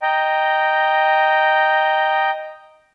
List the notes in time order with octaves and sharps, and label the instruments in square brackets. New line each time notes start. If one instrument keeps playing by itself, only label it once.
[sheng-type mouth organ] D#5 G5 A#5